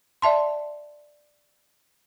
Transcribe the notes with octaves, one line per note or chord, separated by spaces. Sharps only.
D5 E5 A5 C6